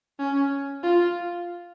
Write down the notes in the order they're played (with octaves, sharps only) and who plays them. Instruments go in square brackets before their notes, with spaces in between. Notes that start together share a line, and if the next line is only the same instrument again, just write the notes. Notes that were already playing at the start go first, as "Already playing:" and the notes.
[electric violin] C#4
F4